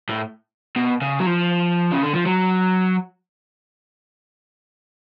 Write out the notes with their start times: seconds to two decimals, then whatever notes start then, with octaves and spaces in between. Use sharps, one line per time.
0.09 A2
0.76 B2
1.02 C#3
1.20 F#3
1.26 F3
1.92 C#3
2.03 D3
2.15 F3
2.26 F#3